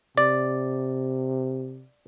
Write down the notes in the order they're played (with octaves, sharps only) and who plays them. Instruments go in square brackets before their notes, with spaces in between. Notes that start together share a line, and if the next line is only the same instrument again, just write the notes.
[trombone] C3 [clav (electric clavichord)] D5